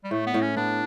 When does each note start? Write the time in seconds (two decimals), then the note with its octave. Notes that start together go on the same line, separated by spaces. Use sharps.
0.04 G3
0.11 A2 A3
0.26 B3
0.34 A2
0.41 C#4
0.57 B3 D4